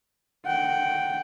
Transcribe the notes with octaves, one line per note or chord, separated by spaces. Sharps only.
F#5 G5